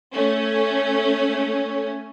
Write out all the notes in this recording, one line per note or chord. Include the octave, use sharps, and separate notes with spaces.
A3 C#4